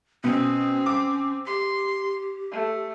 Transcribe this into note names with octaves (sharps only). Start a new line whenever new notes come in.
B2 C4 C#4
D6
G4 C6
A3